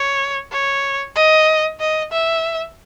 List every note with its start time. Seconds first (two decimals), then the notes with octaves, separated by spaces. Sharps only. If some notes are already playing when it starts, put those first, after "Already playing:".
Already playing: C#5
0.52 C#5
1.15 D#5
1.80 D#5
2.12 E5